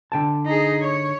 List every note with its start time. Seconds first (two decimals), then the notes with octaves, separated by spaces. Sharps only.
0.12 D3 G5 A5
0.46 D#4 G#4
0.82 C#5